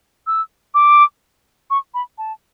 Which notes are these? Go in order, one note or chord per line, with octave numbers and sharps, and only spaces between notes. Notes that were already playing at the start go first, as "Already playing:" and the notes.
E6
D6
C#6
B5
A5